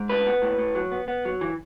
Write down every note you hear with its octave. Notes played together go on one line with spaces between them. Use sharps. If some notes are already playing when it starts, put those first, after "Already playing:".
Already playing: G#2
A2 B4
B3
A2
A2
F#3
B3
B3
F#3
E3